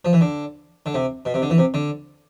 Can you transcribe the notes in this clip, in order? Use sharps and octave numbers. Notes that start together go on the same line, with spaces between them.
F3
E3
D3
D3
C3
B2
C3
D3
E3
C3
D3